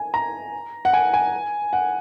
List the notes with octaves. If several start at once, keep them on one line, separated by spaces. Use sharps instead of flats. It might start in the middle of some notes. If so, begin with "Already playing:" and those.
Already playing: G#5
A#5
F#5
G#5
G#5
F#5